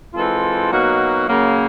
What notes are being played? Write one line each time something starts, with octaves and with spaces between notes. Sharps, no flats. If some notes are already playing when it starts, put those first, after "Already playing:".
E3 G#3 C4 F4 A4
B2 F#3 A#3 D#4 F#4
C#3 F#3 A#3